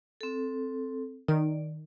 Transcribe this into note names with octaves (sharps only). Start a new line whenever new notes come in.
C4 A4
D#3 D5